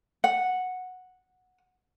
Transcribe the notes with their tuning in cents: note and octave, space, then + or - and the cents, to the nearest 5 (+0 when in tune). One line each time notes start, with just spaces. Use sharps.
F#5 -10